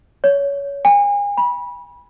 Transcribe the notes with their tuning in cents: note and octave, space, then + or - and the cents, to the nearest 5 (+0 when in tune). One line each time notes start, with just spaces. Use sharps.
C#5 +20
G#5 -35
B5 -20